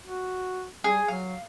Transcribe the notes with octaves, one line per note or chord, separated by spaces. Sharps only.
F#4
G3 G#4
F#3 F5